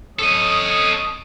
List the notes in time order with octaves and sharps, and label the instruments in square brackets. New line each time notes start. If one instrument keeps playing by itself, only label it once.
[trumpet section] C#4 C#5 D#6 [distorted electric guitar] A4 D#5